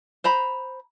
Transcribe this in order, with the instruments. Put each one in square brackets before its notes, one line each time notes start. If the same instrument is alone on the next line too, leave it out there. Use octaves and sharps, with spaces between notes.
[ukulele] C5 A#5 B5